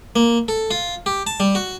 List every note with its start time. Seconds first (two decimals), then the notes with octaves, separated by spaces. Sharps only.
0.16 A#3
0.48 A4
0.71 F4
1.06 G4
1.27 A5
1.40 G3
1.55 F#4